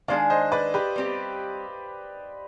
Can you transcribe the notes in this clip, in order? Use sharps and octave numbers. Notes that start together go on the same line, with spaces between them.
D#3 G#3 D4 G#4 D5 F5
C5 D#5
B4 D5
G4 B4
G3 C4 G4